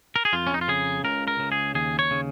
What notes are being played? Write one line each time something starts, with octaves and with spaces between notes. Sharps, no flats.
A#4
G#4
F2 F4
C#4
D#4
F4
C#3 G#4
C#2 A#4
A#4
C#3
G#4
D#2 G#4
C#5
C#3